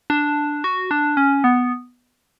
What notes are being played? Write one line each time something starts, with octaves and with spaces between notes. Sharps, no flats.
D4
F#4
D4
C#4
B3